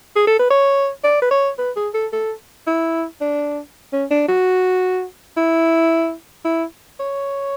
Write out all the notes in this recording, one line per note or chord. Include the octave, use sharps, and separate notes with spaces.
G#4
A4
B4
C#5
D5
B4
C#5
B4
G#4
A4
A4
E4
D4
C#4
D4
F#4
E4
E4
C#5